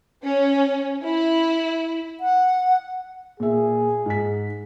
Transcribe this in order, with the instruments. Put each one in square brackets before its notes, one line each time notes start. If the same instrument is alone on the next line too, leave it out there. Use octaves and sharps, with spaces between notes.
[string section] C#4
E4
[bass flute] F#5
[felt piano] A#2 E5 [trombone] G#4
[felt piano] G#2 B6